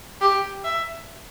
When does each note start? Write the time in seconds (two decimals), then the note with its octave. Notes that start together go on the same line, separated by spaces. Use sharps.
0.21 G4
0.64 E5